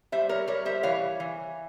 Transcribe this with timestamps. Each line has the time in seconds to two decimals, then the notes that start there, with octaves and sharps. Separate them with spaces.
0.12 G3 C5 E5
0.29 A#4 C#5
0.47 G3 A#4 C#5
0.65 C5 E5
0.83 E3 C#5 F5
1.20 E3